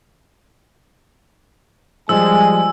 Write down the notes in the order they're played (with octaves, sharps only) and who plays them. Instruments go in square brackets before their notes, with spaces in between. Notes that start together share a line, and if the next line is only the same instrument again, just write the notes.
[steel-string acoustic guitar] F3 G3 [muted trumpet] G#3 [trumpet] G#5 [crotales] E6